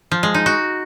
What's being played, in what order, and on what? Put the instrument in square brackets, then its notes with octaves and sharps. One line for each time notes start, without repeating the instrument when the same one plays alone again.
[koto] F3
G#3
D#4
F#4